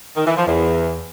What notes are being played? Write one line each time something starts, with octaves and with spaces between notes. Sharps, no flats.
D#3
E3
F3
E2